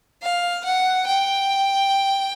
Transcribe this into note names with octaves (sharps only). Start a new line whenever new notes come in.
F5
F#5
G5